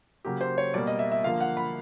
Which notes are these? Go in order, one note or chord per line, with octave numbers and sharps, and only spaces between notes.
C#3 F#3 A#3 G4
C5
C#5
B2 G3 A#3 D5
D#5
E5
E5
D3 F3 A#3 F5
F#5
B5